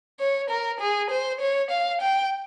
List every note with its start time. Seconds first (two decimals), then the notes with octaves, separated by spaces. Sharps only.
0.20 C#5
0.50 A#4
0.81 G#4
1.11 C5
1.41 C#5
1.71 F5
2.02 G5